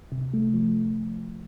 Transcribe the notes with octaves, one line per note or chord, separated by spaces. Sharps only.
C3
A3
F3